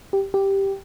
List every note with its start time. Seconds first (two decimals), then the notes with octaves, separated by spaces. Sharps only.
0.13 G4
0.34 G4